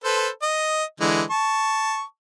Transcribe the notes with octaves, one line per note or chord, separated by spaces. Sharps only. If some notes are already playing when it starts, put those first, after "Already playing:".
A4 B4 C5
D#5
D3 E3 G#3
A5 C#6